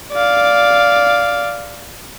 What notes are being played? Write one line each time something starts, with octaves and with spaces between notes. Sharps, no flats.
D5 F5